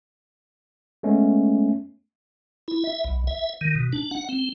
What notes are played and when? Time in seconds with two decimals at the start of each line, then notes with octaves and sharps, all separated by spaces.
1.03 G#3 A3 B3 C#4
2.68 E4
2.84 E5
3.04 B1
3.27 E5
3.61 D#3
3.75 B2
3.93 D4
4.11 F#5
4.29 C4